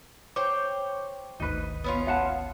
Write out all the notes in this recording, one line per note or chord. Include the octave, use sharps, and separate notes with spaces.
C5 C#5 G5 D6
G#1 D2 D#4 B4
B3 C#4 F4
F5 F#5 A5